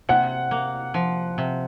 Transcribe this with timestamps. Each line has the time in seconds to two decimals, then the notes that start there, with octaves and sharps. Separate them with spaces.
0.09 C3 F#5
0.51 A#3
0.94 F3
1.38 C3